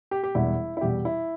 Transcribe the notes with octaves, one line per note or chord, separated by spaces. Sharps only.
G4
G4
E1 E2 B2 G3 E4
E4
E2 B2 G3 G4
E4